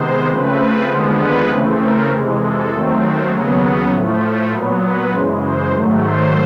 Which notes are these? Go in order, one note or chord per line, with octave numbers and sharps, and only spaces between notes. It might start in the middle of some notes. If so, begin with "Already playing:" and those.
Already playing: C3 D#3 G#3 B3 C5
C#3 F3 A3 C4 B4
D#2 D3 F3 G#3 B3 C5
B4
C#3 E3 A3 C4
A#4
F2 C3 E3 G#3
A4
D#2 D#3 F#3 A3 C4
D#2 C#3 F#3 B3
A2 F3 A3
A#2 F#3 B3 B4
B4
F#2 C#3 E3 G#3 C5
C5
G#2 D#3 F#3 A3
C5